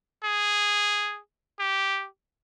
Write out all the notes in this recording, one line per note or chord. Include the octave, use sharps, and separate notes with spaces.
G#4
G4